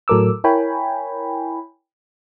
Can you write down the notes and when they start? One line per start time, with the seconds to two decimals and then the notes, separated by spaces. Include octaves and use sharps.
0.08 A2 F#3 A4 A#4 D6 E6
0.44 E4 A#4 C#5 G5 G#5 B5